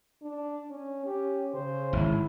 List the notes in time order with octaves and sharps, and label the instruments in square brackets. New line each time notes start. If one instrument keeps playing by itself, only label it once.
[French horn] D4
C#4
[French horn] C#4 [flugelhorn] G4
[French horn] C#3 [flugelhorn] C5
[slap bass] G#1 [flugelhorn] E4